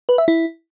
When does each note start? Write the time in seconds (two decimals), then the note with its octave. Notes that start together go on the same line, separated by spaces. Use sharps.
0.09 B4
0.18 E5
0.28 E4